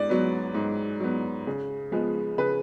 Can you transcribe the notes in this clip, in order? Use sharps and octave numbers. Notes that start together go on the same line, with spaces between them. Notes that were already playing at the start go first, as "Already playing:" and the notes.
Already playing: G#2 D5
F#3 B3
G#2
F#3 B3
C#3
F3 G#3 B3
C#3 B4